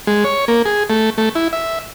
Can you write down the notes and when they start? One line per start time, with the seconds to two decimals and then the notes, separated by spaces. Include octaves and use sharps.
0.07 G#3
0.24 C#5
0.48 A#3
0.65 G#4
0.90 A3
1.18 A3
1.35 E4
1.53 E5